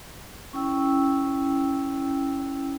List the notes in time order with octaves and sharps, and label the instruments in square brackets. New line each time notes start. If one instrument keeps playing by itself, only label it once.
[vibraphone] C#4 E4 G5 E6